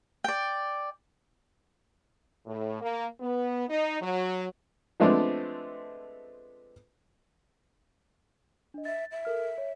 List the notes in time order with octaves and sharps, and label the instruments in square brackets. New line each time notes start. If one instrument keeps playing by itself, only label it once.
[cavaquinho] D5 G5
[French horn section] A2
A#3
B3
D#4
F#3
[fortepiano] F3 G#3 A3 B3 C4 D4
[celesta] D4 D#5
[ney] E5 [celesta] A6
[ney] E5
[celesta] A4 A#4 F6
C#5